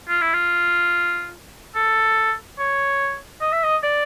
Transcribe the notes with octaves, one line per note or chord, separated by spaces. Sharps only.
F4
E4
F4
A4
C#5
D#5
E5
D#5
D5